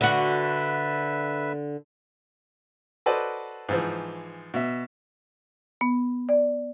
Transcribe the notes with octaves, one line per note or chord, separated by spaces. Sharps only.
D3 F#4 B4 E5
F#4 A4 B4 C5 D5 D#5
G#2 E3 F3
B2 E5
B3
D5